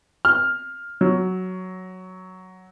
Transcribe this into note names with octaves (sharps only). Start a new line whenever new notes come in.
F6
F#3